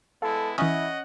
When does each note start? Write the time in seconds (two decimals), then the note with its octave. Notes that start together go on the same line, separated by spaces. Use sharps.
0.22 G#3 B3 E4 A4 F5
0.58 E3 C#4 E4 C#5 D#5 F#5 D#6